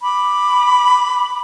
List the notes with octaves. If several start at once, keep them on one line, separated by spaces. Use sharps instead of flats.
B5 D6